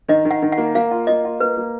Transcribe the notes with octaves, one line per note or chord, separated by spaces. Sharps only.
D#3 D#5
D#3
F#5
D#3
F#5
A#3
A#3 F5
F4
A#3 D#5
F4
A#3 B4
A#3